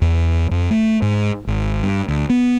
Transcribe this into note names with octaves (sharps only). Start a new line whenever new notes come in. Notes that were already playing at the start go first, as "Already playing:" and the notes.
E2
F2
A3
G#2
G#1
G2
D2
B3